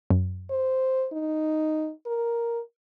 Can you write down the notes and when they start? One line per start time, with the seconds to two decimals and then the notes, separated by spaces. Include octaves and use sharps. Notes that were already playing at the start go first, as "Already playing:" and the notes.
0.11 F#2
0.50 C5
1.13 D#4
2.06 A#4